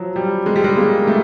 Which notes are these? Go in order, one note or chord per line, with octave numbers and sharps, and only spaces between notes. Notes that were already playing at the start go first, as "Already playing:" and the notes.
Already playing: F3 F#3
G3
G#3
G3
G#3
A#3
A3